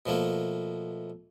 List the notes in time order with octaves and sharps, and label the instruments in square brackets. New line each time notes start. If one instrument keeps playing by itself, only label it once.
[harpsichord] B2 F3 A3 A#3